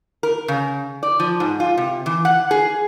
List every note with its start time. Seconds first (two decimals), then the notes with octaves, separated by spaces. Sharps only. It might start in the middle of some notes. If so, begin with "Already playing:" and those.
0.23 A#4
0.48 C#3
1.03 D5
1.20 F3
1.40 G#2
1.60 F4
1.78 C3
2.06 E3
2.25 F#5
2.51 G#4